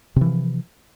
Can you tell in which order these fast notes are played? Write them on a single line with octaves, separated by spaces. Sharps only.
C3 E3 F3